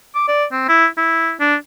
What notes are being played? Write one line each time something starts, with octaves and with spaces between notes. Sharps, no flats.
D6
D5
C4
E4
E4
D4